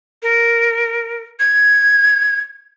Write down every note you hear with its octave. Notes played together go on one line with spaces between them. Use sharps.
A#4
G#6